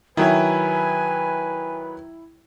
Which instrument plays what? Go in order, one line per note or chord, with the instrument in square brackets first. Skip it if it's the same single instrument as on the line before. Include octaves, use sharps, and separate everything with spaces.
[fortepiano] D#3 F#3 E5 [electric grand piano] E4 [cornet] B4 [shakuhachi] G#5